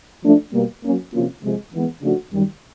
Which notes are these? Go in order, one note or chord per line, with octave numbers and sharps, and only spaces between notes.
F3 A3 D4
B2 G3 A#3
F#3 A#3 C#4
C3 F3 A#3 C#4 F4
C3 F3 G#3
E3 G#3 B3
C#3 F3 A3 D4 F#4
F#2 D#3 G3